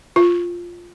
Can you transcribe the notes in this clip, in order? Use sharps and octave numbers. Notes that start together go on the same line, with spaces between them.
F4